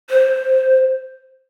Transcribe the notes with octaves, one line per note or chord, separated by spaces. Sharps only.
C5